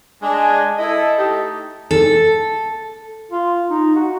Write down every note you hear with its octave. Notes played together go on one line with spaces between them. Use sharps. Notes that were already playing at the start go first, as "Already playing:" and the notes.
G#3 D4 G#5
E4 A4 D#5
A3 D#4 G4
A4
F4
D#4
F#4